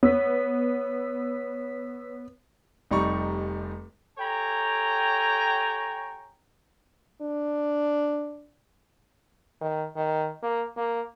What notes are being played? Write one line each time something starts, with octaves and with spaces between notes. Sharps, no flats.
B3 C#5 E6 B6
F1 G3 D#4 C#6
G4 A4 C#5 G5 G#5 A#5
D4
D#3
D#3
A#3
A#3